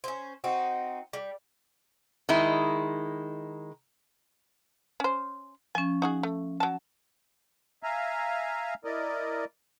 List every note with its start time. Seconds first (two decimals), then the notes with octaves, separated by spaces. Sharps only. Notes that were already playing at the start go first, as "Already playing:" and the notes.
0.04 C#4 C5
0.44 C4 D#4 F#4
1.13 G3
2.29 D#3 G#3 E4
5.00 C#4 C5
5.75 F3 C#4 G#5
6.02 D#4 F#4 G#4
6.23 A3
6.60 F#3 A5
7.83 E5 F5 G#5 A#5
8.85 E4 A#4 D5 D#5